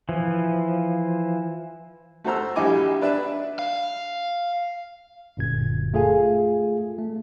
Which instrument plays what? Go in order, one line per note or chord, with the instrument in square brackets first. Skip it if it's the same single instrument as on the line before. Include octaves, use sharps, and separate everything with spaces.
[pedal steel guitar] E3 F3
[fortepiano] A3 F#4 C5 A#5 E6
A#1 G3 E4 D#5 G#5 D6
D4 B4 D5 E5
[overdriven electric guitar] F5
[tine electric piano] G1 F#2 A#2 G#6
A3 F4 G#4 A4 F5 G#5
A3